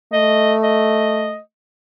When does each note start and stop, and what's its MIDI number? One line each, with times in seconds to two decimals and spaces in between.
0.13 1.38 57
0.13 0.54 75
0.63 1.39 75